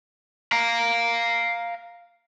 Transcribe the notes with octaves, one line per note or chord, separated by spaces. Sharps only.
F5 A#5